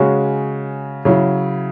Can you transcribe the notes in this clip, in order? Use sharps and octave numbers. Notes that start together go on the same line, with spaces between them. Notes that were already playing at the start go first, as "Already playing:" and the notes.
Already playing: C#3 G#3 C#4 F#4
C#3 F#3 E4